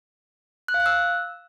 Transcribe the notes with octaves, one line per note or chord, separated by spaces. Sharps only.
F#6
F5
F#6
E6